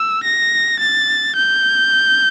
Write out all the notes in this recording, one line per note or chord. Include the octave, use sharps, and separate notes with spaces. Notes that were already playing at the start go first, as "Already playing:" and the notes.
Already playing: E6
A#6
A6
G6